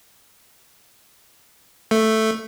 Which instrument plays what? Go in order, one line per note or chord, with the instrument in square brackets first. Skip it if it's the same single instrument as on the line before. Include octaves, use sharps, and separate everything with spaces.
[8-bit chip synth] A3